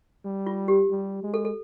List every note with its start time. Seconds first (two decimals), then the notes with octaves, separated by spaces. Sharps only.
0.25 G3
0.46 F4
0.68 G4
0.90 G3
1.23 G#3
1.34 A4
1.45 A4